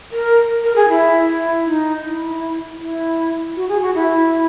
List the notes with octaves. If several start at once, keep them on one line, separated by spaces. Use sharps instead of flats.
A#4
A#4
G#4
E4
E4
D#4
E4
E4
F#4
G#4
F#4
E4